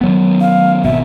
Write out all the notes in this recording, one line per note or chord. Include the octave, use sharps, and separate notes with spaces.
D#3 F#3 B3
F5
G#1 B2 E5